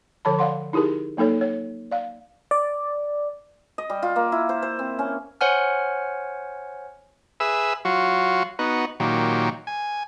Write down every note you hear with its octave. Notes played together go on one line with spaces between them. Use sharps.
D3 F3 C#5 A5 B5
D5 F5 F#5 C6
D#4 E4 G4 G#4 A#4
F#3 A#3 D#4 A4 C#5
C#5
D5 F5
D5
D#5
G3
F4
A#3
E4
C5
C5
C4
C#4
C5 C#5 F#5 G#5 F6
G#4 B4 E5 E6
F#3 F4 F#4
B3 D#4 F#4
A#2 D#3 F#3 G4
G#5